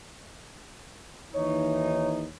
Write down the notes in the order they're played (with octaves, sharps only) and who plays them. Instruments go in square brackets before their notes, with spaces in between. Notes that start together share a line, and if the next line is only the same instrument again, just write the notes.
[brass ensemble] D#2 E3 D#4 [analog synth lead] C#5